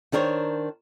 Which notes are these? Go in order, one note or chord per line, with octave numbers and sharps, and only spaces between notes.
D#3 D4 A#4 C5 C#5